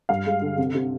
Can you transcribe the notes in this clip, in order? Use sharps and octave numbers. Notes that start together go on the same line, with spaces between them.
G2 F5
G#3
D3
C3
C3